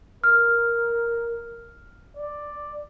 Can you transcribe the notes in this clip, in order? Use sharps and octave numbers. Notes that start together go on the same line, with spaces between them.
A#4 F6
D5